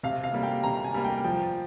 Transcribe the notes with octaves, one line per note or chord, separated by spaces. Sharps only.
C3 F5
F5
G3 A#3
G5
C3 A#5
G#5
G3 A#3
G5
F3 G5